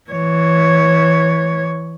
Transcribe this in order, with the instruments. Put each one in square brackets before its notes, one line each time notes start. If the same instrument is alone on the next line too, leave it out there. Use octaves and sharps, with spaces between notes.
[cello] E3 C#5